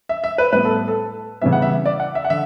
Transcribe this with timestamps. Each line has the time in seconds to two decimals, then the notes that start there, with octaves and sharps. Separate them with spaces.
0.09 E5
0.24 E5
0.38 B4
0.52 A2 G3 B3 B4
0.65 A4
0.88 A4
1.42 C#3 E3 G3 B3 E5
1.52 F#5
1.62 E5
1.86 D5
2.00 F#5
2.15 E5
2.25 F#5
2.30 D3 E5